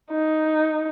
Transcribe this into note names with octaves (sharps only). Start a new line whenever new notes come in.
D#4